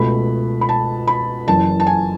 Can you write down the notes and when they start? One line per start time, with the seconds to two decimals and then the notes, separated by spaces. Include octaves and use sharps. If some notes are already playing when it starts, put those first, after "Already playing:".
Already playing: C#2 B2 A3 B5
0.61 B5
0.69 A5
1.07 B5
1.47 F#1 F#2 E3 A5
1.80 A5
1.87 G#5